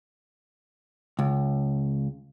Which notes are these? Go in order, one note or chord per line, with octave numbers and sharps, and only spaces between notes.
C#2